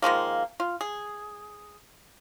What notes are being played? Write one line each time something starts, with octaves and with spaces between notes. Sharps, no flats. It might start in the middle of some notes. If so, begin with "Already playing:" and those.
D#3 F3 G#3 A#3
F4
G#4